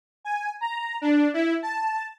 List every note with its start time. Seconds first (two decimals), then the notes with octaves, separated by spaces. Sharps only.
0.25 G#5
0.61 A#5
1.01 D4
1.34 E4
1.63 A5